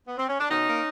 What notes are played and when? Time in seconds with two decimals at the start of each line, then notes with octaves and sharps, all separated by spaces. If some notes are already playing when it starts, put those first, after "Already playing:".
0.07 B3
0.17 C4
0.28 C#4
0.39 D4
0.49 B2 C#4 D#4
0.67 A#3